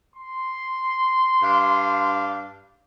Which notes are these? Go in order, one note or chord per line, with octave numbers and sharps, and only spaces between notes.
C6
G2 D4 F5